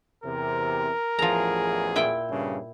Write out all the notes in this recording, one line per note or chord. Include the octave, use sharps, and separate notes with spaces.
E2 C3 A#4
A1 E2 F3 G#4 A#5
A#2 E4 G5
G2 C#3